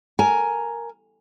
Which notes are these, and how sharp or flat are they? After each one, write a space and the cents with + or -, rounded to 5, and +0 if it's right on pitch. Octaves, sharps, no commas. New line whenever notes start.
A#4 +0 G#5 +10